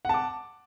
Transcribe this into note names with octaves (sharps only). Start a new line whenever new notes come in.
F#5 A5 D6